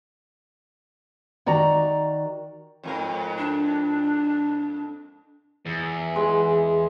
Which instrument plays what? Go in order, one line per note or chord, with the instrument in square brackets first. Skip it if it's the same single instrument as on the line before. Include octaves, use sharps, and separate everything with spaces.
[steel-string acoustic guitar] D#3 F#4 D5 A#5
[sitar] F2 G#2 A#4
[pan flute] D4
[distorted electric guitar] E2
[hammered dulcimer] G#3